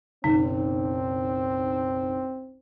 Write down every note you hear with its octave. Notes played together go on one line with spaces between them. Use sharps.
F#1 B1 D#3 C4 D#4